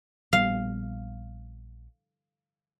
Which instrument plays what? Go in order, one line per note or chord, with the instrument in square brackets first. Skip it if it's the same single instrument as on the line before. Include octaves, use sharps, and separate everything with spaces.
[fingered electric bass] A#1 G3 B3 [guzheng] F5